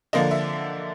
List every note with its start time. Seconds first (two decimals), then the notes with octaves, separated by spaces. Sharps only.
0.13 D3 F3 A#3 D4 D#5
0.31 E5